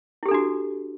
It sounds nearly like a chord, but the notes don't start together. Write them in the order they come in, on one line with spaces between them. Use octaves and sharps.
E4 G4 A4 D4 F#4